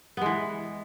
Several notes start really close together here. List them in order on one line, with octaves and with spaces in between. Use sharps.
B3 G#3 E3